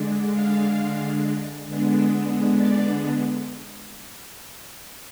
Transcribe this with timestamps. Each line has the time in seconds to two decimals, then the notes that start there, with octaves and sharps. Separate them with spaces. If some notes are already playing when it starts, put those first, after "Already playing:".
Already playing: D3 G#3 D4
0.32 F5
1.66 D3 G#3 B3 D4
2.57 D5